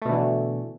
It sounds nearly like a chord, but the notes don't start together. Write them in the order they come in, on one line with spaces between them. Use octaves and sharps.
A3 B2 D3 E3